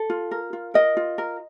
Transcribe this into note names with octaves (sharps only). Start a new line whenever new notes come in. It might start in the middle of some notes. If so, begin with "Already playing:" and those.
Already playing: A4
F4
A#4
F4
A#4 D#5
F4
A#4